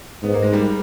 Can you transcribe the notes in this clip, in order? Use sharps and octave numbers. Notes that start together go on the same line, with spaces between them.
G#2 B3
A#3
G#3
G3 A#3